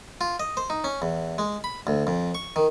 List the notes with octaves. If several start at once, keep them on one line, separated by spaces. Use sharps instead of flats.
F4
D#5
C5
D#4
C#4
E2
G#3
B5
D2
F2
C#6
D#3